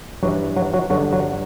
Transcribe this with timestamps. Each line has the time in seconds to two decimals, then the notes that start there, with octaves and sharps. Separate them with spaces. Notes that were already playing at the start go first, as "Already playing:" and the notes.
0.23 G2 E3 F#3 F#4
0.56 F#3 F#4
0.73 F#3 F#4
0.90 G2 D3 F#3 F#4
1.13 F#3 F#4